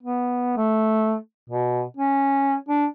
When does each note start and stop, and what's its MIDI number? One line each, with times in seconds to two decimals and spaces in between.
0.03 0.52 59
0.57 1.16 57
1.50 1.83 47
1.97 2.56 61
2.69 2.85 62